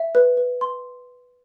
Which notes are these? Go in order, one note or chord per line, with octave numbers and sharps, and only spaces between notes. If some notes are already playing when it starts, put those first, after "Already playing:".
Already playing: E5
B4
B4
C6